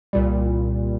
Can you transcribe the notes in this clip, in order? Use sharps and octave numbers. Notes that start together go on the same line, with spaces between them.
C2 A#2 G3